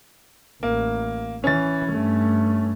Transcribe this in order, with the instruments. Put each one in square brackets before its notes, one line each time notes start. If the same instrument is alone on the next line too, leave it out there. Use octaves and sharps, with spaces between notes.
[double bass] A1 [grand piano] A#3
[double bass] E3 [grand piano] C#4 A6
[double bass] G2 A3